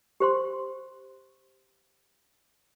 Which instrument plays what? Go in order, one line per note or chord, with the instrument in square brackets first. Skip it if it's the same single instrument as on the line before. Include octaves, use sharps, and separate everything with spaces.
[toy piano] G4 C5 C6